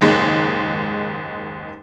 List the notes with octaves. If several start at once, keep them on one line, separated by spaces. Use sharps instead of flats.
F#1 D#2 G#2 G#3